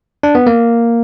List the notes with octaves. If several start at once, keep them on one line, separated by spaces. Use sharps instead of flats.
D4
B3
A#3